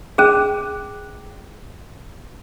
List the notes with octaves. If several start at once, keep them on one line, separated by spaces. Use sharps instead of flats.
C#4 G#4